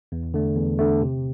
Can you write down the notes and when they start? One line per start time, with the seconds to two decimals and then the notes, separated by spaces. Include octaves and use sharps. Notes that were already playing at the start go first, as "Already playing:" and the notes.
0.12 E2
0.34 D3 A3
0.56 E2
0.79 D3 A3
1.02 C3